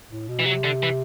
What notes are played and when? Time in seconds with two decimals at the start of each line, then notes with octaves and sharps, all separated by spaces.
0.10 A2
0.28 B2
0.39 E3
0.46 C3 F#3
0.64 D3
0.83 E3